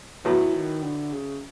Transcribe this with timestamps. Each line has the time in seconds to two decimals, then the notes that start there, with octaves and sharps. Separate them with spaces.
0.25 A2 E3 F#3 B3
0.54 D#3
0.83 D3
1.13 C#3